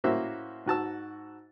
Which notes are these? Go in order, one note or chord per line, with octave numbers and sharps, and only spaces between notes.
A2 A#3 C#4 F#4 C5 E5
G#2 F#4 A5 E6